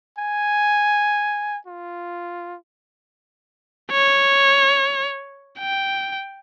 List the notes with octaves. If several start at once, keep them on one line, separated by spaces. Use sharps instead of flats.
G#5
F4
C#5
G5